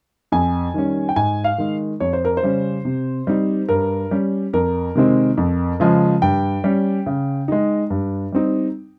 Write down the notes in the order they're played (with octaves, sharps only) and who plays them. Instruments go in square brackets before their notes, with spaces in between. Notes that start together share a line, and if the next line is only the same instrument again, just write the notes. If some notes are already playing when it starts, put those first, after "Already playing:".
[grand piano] F2 G#5
D#3 G3 C#4
G5
G#2 G#5
F5
D#3 G#3
F2 C#5
C5
A#4
C5
C#3 G3 C#4
C3
G3 C4 D#4
G2 A#4
G3 C#4
F2 A#4
C3 D#3 G#3 C4
F2
C#3 F3 G#3
G2 G5
G3 C#4
C#3
G#3 D#4
G2
G3 C4 D#4